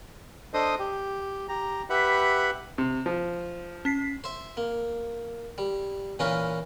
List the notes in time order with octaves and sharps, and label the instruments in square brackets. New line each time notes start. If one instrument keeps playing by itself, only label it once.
[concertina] D4 A4 C5 D#5 D#6
G4
G4 A#5
G4 B4 E5 F#5 B5
[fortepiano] C3
F3
[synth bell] C#4 B6 C7
[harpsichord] C5 E5
A#3
G3
A#2 E3 C#4 A#4 B4 F5